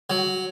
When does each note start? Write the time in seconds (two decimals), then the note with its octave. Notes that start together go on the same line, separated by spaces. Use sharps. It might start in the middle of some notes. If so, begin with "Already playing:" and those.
0.10 F#3